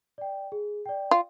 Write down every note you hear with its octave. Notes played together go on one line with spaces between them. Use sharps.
D5 G5
G#4
D5 G5
F4